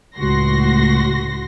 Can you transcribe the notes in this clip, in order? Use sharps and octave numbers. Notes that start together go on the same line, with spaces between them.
C#2 A2 F#4 C6 A#6